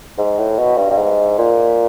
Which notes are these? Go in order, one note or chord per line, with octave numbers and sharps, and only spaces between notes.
G#2
A2
B2
G2
G2
G#2
A#2